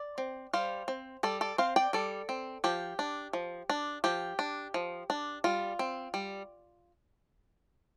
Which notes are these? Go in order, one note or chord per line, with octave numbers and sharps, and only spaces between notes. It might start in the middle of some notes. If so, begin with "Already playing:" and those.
Already playing: D5
C4
G3 C5 F5
C4
G3 A4 D5
A4 D5
C4 C5 F5
D5 G5
G3 A4 D5
C4
F3 G4
D4
F3
D4
F3 G4
D4
F3
D4
G3 F4
C4
G3